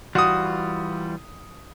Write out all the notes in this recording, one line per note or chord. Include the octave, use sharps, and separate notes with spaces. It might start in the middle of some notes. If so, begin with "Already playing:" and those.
E3 G3 F4 F#4 D#6